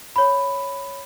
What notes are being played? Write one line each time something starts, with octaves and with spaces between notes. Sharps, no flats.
C#5 B5